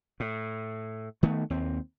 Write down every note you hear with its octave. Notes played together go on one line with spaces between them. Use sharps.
A2
D#3 A3 B3
D#2 C4